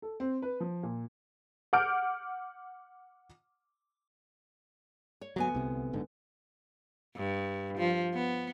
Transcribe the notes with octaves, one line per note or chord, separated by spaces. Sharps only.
A4
C4
B4
F3
A#2
F#5 D6 F6 G6 D7
C#5
D2 F#3 B3 G#5
C2 C3
F#1 G#2 D3
G2
F3
B3